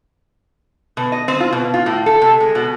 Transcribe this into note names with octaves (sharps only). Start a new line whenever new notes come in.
B2
D#5
C4
F4
B2
F4
A2
A4
C3
G#3
B2